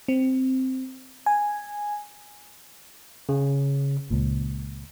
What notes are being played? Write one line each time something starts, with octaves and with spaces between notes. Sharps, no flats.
C4
G#5
C#3
C#2 A#2